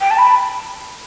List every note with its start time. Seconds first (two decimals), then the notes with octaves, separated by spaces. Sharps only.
0.01 G5
0.11 A5
0.18 B5